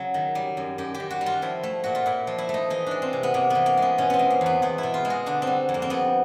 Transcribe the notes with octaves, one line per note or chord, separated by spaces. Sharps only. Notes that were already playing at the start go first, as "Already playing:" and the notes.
Already playing: C#3 F#3
D#3
G3
F#2
F#2 G4
G4
D#3
F#4
G3
F4
F3 E4
A3
A#2 F#4
F4
A#2 E4
F3
E4
A3
D#4
E3 D#4
G#3 D4
C4
C3
B3
C3 A#3
E3 B3
A#3
G#3 B3
B2 C#4
B3 C4
G#3
A#3
E2 B3
E2 B3
E4
B2
F4
G#3
F#4
D3 D4
C4
G3
F2
A#3
C4
F2 B3